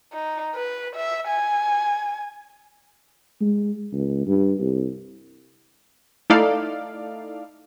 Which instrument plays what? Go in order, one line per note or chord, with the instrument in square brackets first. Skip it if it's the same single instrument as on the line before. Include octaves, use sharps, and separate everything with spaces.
[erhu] D#4
B4
E5
G#5
[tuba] G#3
C#2
G2
C2
[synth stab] A3 D#4 E4 A4 D5 F5